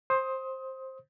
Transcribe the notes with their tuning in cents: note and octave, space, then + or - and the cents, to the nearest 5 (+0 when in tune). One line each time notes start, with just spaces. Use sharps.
C5 +15 D#6 +25